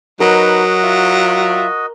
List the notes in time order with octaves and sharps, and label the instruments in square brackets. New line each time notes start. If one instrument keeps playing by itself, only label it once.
[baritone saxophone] F#3 [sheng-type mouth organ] D#4 B4 [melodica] F#4 D#5 [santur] A#4
[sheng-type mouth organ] F4 E5